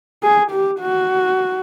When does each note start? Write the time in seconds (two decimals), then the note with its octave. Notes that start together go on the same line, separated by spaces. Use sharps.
0.23 G#4
0.51 G4
0.80 F#4